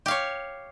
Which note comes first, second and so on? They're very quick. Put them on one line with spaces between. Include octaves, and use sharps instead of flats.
G4 F5 C#5